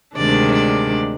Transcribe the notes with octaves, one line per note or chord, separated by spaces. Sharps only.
D2 C3 D#3 G#3 D4 D5
D5